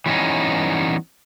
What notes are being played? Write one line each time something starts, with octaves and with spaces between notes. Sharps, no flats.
E3 G3 B3 C#4 D#4